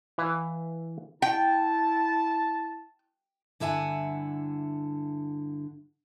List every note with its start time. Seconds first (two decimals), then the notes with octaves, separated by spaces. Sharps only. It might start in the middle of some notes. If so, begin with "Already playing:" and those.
0.18 E3 E4 B4 F5
1.22 E4 G5 A5
3.60 G2 D3 E4 E5 F#5 G#5